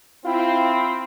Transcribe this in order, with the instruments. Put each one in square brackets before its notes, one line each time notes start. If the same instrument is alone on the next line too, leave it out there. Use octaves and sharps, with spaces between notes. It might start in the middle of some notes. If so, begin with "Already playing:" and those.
[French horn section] C4 [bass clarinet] E4 [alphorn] F4